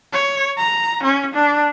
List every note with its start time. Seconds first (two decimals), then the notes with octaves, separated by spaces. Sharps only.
0.13 C#5
0.58 A#5
1.04 C#4
1.35 D4